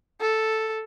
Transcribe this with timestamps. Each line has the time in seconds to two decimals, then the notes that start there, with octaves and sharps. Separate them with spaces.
0.21 A4